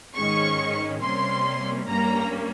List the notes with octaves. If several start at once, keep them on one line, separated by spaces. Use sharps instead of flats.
G#2 D#3 G#3 C#4 C#6
C3 G3 A#3 C#4 C6
G2 G3 A#3 C#4 A#5